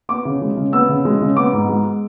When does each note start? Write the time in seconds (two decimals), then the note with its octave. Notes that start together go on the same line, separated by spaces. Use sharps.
0.09 B3 D6
0.25 C#3
0.41 G#3
0.57 C#3
0.72 B3 E6
0.89 C#3
1.05 G#3
1.21 C#3
1.37 B3 D6
1.53 G#2
1.69 G#3